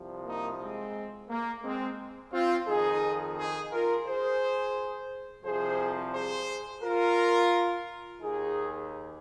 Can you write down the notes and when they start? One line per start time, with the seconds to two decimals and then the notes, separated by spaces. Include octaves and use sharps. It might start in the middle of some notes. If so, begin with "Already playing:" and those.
Already playing: C2 C3 F3
0.25 A#3 D#4
0.60 G#3 C4
1.30 A#3
1.63 G#3 C4
2.33 C4 F4
2.67 F2 D#3 D#4 G#4
3.37 D#4 G#4
3.72 F4 A#4
4.06 G#4 C5
5.44 C2 C3 F3 G#4 C5
6.14 G#4 C5
6.83 F4 A#4
8.21 D#2 D#3 D#4 G#4